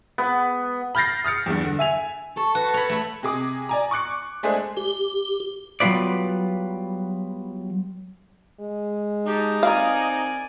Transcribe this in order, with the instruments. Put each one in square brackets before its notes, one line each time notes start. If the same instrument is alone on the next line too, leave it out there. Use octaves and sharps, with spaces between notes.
[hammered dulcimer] B3
[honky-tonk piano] B5 F6 G6 A6 A#6 C7
D#6 F6 A6 C#7
E2 G2
D3
E5 G#5 F7
[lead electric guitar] A4 [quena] C#6
[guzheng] F#4 [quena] B4
[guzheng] C#5 B5
A3 B5
[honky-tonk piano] C3 G#4 D6 D#6
D5 G#5 A#5
C#6 D6 F#6 C#7
G#3 A3 D4 G#4 C5
[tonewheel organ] G4
[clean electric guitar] F#3 G3 B3 F4 B4 D5
[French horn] G#3
[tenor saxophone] D#4 [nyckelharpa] G4 A5
[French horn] C4 [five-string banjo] A#4 F5 [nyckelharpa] D5 G#5